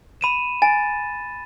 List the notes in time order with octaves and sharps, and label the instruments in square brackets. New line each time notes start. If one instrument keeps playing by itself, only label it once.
[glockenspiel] B5 D#7 E7
[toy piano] G#5 [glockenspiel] A6